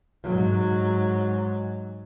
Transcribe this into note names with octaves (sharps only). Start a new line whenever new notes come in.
G#2 F#3